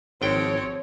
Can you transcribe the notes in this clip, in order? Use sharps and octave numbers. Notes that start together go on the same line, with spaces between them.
G#1 F3 C4 C#5 G5